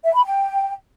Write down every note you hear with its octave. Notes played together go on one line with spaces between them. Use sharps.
E5
B5
G5